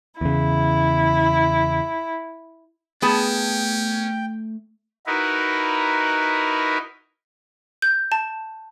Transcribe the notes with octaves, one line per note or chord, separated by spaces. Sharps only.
E2 C#3 E4
A3 B3 C#4 G#4 G5 A5
D#4 E4 F#4 A#4 B4
G6
A5